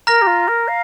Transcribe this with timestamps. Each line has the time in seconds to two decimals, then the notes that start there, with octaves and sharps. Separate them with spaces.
0.07 A#4 A#5 F6 A#6
0.21 G4
0.26 F4
0.48 A#4
0.68 F5